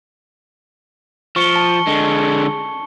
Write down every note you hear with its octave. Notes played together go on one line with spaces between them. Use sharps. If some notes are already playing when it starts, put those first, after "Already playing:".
F3 C#6 C#7 G7
A5
D3 G#3